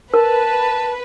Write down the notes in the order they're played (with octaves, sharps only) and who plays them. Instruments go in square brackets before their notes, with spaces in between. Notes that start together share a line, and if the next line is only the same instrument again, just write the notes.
[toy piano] A#4 [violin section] B4 [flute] A5